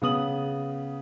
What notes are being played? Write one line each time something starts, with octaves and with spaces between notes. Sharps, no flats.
C#3 B3 D#6 F#7